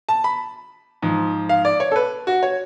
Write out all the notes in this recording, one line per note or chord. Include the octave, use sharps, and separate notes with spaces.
A5
B5
G#2 F3
F5
D5
C#5
A4
B4
F#4
C#5